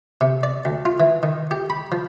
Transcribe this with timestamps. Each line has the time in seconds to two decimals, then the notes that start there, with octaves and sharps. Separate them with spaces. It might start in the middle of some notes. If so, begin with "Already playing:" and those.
0.21 C3
0.43 D5
0.65 D2
0.85 F4
1.00 E3
1.23 D#3
1.51 G4
1.70 B5
1.92 F3